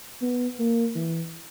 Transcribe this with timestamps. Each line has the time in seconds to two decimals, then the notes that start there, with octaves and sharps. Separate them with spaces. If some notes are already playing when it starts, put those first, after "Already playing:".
0.22 B3
0.59 A#3
0.96 E3